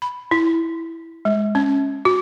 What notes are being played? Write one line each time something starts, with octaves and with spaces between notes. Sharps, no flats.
B5
E4
G#3
C#4
F#4